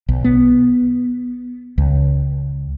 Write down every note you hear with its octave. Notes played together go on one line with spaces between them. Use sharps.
B1
B3
C#2